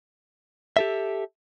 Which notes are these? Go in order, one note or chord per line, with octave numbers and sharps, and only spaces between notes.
G4 A4 E5